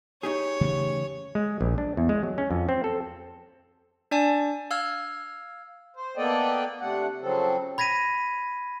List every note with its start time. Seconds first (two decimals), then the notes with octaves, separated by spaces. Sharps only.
0.23 D#4 G4 G#4 C#5
0.61 C#3 E3 A3
1.35 G#3
1.61 A#1
1.78 D4
1.97 E2
2.09 G#3
2.23 F#3
2.38 C#4
2.51 F2
2.69 C4
2.84 A4
4.11 D4 D5 G#5 A5
4.71 F5 E6 F6 G#6
5.96 C5
6.17 A#3 B3 A4 D5 D#5 G5
6.81 C3 A3 D4 F#5
7.21 C#3 F3 F#3 C4 A4
7.78 B5 G#6 A#6 B6 D#7